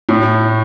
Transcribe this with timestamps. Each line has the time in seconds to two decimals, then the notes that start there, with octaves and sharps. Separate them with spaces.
0.09 A2